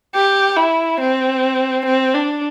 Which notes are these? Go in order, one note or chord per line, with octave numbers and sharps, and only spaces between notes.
G4
E4
C4
C4
D4